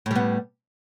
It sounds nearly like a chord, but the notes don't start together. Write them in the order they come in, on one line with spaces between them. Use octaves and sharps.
A2 G3 B3